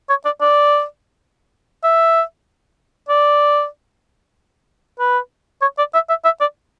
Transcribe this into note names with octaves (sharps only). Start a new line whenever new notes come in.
C#5
D5
D5
E5
D5
B4
C#5
D5
E5
E5
E5
D5